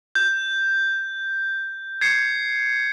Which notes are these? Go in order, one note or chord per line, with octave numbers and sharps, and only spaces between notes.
G6
G#6 C7 C#7